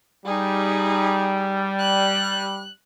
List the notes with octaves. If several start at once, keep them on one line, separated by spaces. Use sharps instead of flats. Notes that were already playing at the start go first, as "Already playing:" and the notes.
G3 D#4 G#4
F#6